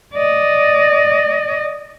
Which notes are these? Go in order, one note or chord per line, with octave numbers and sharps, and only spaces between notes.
D5 D#5